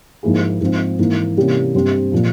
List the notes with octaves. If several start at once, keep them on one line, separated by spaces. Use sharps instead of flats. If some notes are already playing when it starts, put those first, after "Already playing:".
G#2 F3 A#3 E4 G#4
G#2 F3 C4 F4
G#2 E3 A#3
C3 E3 G3 A#3 C#4
G2 G3 C4 G4 C5
A#2 F3 A#3